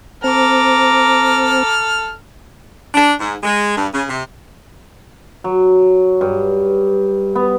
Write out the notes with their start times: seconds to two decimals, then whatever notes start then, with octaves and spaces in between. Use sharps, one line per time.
0.24 C4 A4 A#5 D6 F6
2.94 D4
3.20 G#2
3.43 G#3
3.76 G2
3.93 C#3
4.08 C3
5.44 F#3
6.21 G2
7.35 B3